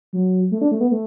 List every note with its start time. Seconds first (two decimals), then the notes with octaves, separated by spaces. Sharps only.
0.13 F#3
0.51 A3
0.61 D4
0.72 A3
0.81 B3
0.91 A3